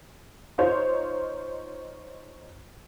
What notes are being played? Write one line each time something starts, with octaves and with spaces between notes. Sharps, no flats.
D#4 F4 C5 C#5